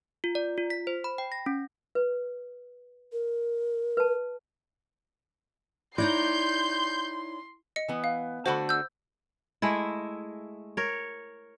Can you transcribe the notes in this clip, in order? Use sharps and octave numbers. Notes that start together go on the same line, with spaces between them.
F4
D5
F4
B6
C5
B5
G5
A#6
C#4
B4
A#4
B4 A5
D#4 E4 C#5 D5 C6 G6
D#5 C#7
E3 B3
F5
D3 A3 F#4 C5 F#5 B5
E6 G6
G#3 A3 E4
A#4 C#5